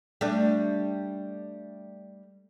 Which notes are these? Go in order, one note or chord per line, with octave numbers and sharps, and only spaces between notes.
G3 A3 D4